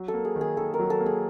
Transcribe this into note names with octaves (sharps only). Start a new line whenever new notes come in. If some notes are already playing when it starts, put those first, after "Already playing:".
Already playing: F#3
A4
A#3
G#4
D#3
G#4
D#3 A4
A#4
F#3
A4
A#3
G#4